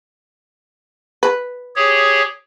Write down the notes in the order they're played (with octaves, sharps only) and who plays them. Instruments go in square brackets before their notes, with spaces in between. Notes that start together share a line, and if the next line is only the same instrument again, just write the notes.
[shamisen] B4
[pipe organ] G4 G#4 C#5